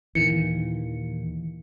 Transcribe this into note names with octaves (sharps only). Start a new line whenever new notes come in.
D#2 A#2 D#3 E3 C#7